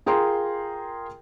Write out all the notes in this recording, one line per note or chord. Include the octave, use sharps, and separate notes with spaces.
F4 G#4 A#4 G5 A#5 C6